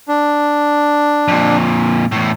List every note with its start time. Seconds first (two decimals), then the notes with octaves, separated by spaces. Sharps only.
0.08 D4
1.28 F2 A#2
2.12 E2 A2